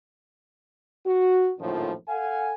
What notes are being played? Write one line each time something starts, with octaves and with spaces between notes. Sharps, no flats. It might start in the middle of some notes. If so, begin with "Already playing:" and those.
F#4
A#1 F#2 A2 D#3 F3
A4 F5 F#5 G#5